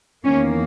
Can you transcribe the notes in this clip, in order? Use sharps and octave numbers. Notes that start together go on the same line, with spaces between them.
E2 D#3 A#3 C#4